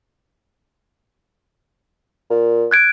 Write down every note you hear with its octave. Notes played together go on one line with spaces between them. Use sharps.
A#2
F#6 G#6 D7